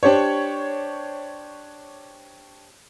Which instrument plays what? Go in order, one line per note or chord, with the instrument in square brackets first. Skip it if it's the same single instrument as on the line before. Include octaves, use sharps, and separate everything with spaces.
[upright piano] D4 G4 C5 C#5